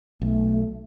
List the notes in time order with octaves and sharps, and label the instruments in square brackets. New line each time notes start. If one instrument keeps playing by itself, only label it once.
[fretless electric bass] B1 [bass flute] A3